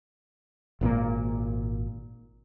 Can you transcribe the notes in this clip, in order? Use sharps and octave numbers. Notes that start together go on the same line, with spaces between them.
G#1 A#2 D#3 A#3